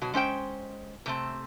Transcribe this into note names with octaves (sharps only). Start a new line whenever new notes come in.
B2 F#3 F#4
G#3 C#4 C5 G5
C3 A3 C4